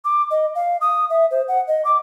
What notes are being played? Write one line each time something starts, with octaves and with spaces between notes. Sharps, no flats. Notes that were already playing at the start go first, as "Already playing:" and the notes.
D6
D#5
F5
D#6
E5
C5
F#5
D#5
D6